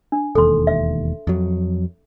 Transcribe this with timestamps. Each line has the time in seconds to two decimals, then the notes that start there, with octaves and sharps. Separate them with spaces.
0.12 D4
0.35 E1 D#2 A4 C6
0.67 E5
1.27 F2 F#3